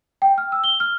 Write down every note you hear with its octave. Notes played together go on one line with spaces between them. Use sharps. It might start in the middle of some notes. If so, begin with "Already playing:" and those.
G5
F6
E6
G7
F6